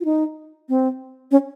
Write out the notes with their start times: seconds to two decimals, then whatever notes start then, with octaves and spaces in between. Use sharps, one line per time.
0.01 F4
0.05 D#4
0.69 C4
1.31 C#4